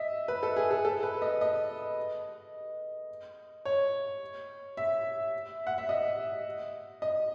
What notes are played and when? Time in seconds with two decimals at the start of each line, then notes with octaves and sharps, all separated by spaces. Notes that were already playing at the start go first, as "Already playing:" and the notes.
Already playing: D#5 E5
0.28 B4
0.43 A4
0.57 G#4
0.71 A4
0.85 A4
1.03 B4
1.22 D#5
1.41 D#5
3.65 C#5
4.77 E5
5.67 F#5
5.78 E5
5.89 D#5
7.02 D#5